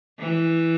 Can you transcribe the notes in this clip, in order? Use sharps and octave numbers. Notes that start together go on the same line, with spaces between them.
E3